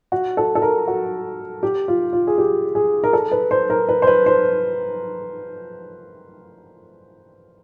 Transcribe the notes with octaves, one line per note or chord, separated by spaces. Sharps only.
F#4
A4
A4
A#4
F#4
G4
F4
F4
G#4
G4
G#4
A#4
A4
B4
C5
A#4
B4
C5
B4
C5